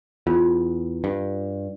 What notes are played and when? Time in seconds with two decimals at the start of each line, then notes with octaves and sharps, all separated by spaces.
0.27 E2 F4
1.04 G2